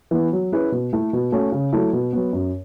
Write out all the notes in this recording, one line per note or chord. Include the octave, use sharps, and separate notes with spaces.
E3 B3
F#3
C#4 E4 G#4 B4
B2
A3 E4 A4
B2
A3 C#4 F#4
C#3
F#3 A3 E4
B2
F#3 B3
F#2